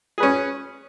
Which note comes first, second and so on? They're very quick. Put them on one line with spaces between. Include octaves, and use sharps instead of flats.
G#4 B4 C#4